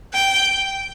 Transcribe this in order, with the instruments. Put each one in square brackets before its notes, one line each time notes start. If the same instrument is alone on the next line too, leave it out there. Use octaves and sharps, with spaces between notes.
[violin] G5